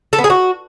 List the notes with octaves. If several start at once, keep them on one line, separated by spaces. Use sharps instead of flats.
A4
B3
G#4
F#4